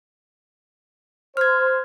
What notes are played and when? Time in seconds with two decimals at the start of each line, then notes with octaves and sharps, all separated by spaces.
1.37 C5 F6 G#6